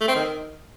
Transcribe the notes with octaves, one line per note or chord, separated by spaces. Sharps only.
A3
C4
D#3